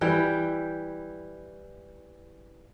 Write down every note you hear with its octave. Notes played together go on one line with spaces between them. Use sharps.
E3 G3 G5